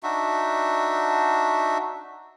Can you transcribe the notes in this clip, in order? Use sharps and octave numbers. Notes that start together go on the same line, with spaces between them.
D4 D#4 F#4 E5